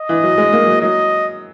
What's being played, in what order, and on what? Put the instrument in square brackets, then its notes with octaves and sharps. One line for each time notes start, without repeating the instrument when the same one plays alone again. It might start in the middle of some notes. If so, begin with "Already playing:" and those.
Already playing: [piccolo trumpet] D#5
[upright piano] E3
F#3
G#3
A#3
F#3
[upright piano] F#3 [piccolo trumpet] D#5